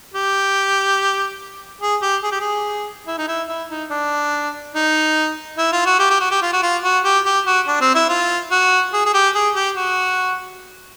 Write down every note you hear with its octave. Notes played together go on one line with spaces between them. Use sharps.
G4
G#4
G4
G#4
G4
G#4
E4
D#4
E4
E4
D#4
D4
D#4
E4
F4
F#4
G4
G4
F#4
G4
F4
F#4
F4
F#4
G4
G4
F#4
D4
C4
E4
F4
F#4
G#4
G#4
G4
G#4
G4
F#4